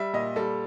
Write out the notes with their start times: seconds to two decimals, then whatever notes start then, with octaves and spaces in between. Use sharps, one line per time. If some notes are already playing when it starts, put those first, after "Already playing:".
Already playing: G3 E5
0.13 A#2 D#5
0.36 G3 A4